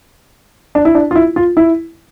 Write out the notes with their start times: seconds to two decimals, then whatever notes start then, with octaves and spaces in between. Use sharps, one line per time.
0.75 D4
0.85 E4
0.95 D4
1.11 F4
1.16 E4
1.36 F4
1.57 E4